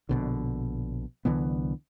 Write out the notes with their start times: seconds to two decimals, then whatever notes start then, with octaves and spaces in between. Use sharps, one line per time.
0.09 A#1 B2 D3
1.25 C2 D3 E3 B3